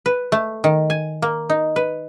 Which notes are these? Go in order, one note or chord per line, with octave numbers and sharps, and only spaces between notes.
B4
A3
D#3
G#5
A#3
D#4
B4